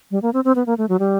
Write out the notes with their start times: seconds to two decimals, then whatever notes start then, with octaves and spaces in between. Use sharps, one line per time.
0.11 G3
0.22 A#3
0.33 C4
0.45 C4
0.56 B3
0.66 A#3
0.78 A3
0.89 F#3
0.99 G3